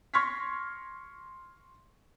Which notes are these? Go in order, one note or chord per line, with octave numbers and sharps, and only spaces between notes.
C6 C#6 F6 G#6 A#6 B6